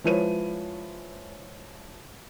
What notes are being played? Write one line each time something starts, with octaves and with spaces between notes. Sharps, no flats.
F3 G#3 E4 B4 C#5 D#7